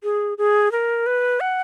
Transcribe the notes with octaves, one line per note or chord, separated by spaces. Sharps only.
G#4
G#4
A#4
B4
F#5